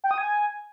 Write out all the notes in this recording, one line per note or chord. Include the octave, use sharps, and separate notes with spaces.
G5
D#6
G#5